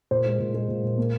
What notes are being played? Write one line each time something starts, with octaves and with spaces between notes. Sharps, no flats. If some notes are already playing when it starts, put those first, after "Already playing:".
A#2 C5
G#3
A#2
G#3
A#2
A#2
A#3